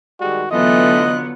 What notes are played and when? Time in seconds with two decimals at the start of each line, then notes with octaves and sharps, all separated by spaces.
0.20 D#3 G3 G#3 F#4
0.51 D3 E3 F#3 A3 B3 F4 D#5 F#6